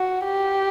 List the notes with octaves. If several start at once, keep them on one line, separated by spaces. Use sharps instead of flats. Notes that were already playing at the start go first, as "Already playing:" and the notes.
Already playing: F#4
G4